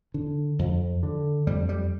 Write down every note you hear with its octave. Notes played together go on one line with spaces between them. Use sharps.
D3
F2
D3
F2 G3
G3